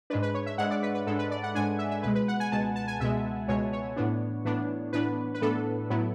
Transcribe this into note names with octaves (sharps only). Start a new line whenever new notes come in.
G#2 G#3 D4 B4
B4
C#5
E5
G#2 G#3 D4 F#5
D5
B4
B4
G#2 G#3 D4 A4
B4
D5
F#5
G#2 G#3 D4 G#5
E5
E5
C#2 B2 G#3 B4
B4
F#5
G#5
C#2 B2 G#3 A5
A5
G#5
C#2 B2 G#3 E5
C#2 B2 G#3 C#5
C#5
A2 E3 B3 D4
A2 E3 B3 D4
A2 E3 B3 D4 B4
B4
A2 E3 B3 D4 A4
A2 F#3 B3 E4